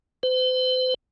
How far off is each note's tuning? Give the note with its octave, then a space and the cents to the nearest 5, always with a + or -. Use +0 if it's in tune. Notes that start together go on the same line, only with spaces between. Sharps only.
C5 -40